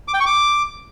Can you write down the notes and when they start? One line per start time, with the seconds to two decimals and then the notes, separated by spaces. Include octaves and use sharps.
0.08 D6
0.14 G5
0.20 C#6
0.26 D6